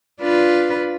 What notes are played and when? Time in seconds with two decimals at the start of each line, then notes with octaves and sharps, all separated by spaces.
0.20 D4 F4 B4